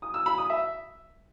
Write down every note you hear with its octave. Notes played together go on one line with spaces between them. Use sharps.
D#6
E6
B5
D#6
E5